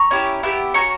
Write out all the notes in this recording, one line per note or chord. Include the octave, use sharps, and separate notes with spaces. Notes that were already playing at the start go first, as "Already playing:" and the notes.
Already playing: A#5 C#6
C#4 E4 G4
B3 E4 G4
C#4 F#4 A#5 C#6